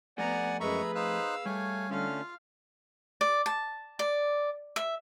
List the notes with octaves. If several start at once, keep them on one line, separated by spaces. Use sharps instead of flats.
F3 A3 B3 A4 D5 F#5 G#5 A#5
F#2 G#3 G#4 B4 E5 A#5 B5 C#6
D#4 C5 F5 E6 F#6
G3 A3 C#5 F5 G#5
D3 A3 C#4 F4 F5
D5
A5
D5
E5